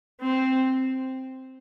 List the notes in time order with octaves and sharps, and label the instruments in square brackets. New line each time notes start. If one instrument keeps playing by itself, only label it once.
[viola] C4